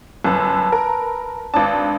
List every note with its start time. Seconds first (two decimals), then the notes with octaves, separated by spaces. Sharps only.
0.24 G1 F#2 A4 B4
0.72 A#4
1.54 G#1 D4 B4 A5